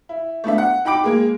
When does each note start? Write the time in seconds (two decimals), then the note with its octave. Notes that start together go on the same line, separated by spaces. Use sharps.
0.09 E4
0.44 A3 B3 D4 E5
0.58 F#5
0.85 D#4 G5 B5 D6 D7
1.04 G#3 A#3 G#4